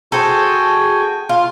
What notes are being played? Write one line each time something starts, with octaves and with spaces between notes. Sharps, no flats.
F#4 G#4 A4 C5 G5 G#5
F4